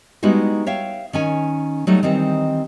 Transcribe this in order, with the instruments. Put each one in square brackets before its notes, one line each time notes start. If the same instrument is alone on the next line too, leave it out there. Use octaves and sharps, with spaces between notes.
[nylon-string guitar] G3 G#3 B3 D#4 E4 F#4
C#5 E5 F5 G5
D#3 C#4 G#5
F#3 G3 A3 D#4
D#3 E3 G3 C4 D#4